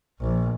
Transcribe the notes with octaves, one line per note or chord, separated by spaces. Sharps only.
A#1